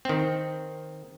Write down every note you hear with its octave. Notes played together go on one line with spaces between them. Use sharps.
D#3 C4